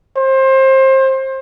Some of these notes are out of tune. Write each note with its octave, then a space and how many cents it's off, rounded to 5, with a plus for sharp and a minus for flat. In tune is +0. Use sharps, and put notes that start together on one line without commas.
C5 +25